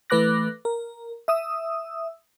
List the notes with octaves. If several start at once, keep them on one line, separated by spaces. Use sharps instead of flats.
E3 A3 B4 D6 F#6 A#6
A#4
E5 D#6 E6